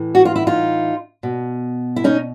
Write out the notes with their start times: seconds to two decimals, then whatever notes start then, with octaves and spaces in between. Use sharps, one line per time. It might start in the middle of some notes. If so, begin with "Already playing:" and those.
Already playing: A2 E3
0.15 F#4
0.25 F4
0.36 E4
0.47 D#4 F4
1.23 B2
1.96 E4
2.04 C#4 D#4